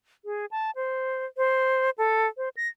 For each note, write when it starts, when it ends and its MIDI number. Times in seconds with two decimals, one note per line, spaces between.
0.25 0.46 68
0.51 0.71 81
0.76 1.25 72
1.37 1.90 72
1.98 2.27 69
2.37 2.49 72
2.57 2.68 94